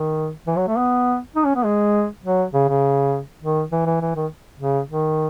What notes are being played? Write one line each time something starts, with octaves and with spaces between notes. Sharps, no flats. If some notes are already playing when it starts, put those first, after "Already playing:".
Already playing: D#3
E3
F#3
A3
B3
D#4
C#4
B3
G#3
F#3
C#3
C#3
D#3
E3
E3
E3
D#3
C#3
D#3